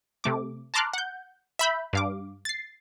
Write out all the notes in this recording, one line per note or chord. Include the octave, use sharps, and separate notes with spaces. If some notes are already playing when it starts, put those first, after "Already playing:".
C3 A3 D6
A5 A#5 C6 D6 F6 F#6
F#5 G6
E5 B5 G6
G2 F5 D6
A6 C7